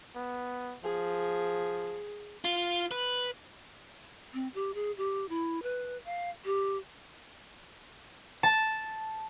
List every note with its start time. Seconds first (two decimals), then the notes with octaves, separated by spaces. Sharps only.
0.16 B3
0.84 F3 G#4
2.44 F4
2.91 B4
4.34 C4
4.55 G4
4.74 G#4
4.97 G4
5.29 E4
5.63 B4
6.05 F5
6.45 G4
8.43 A5